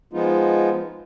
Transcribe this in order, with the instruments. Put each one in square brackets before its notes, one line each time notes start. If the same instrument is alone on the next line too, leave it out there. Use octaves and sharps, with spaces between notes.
[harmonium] F3 G#3 B3 D#4 F4